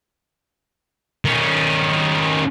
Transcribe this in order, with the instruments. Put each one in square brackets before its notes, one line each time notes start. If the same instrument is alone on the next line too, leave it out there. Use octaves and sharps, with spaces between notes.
[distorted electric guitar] D#3 C#4